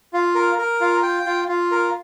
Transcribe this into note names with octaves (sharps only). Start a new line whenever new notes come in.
F4
A#4
A#4
F4
G5
F4
F4
A#4